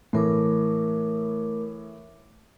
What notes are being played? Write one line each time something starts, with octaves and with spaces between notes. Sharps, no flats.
A2 E3 A3 A#4 D6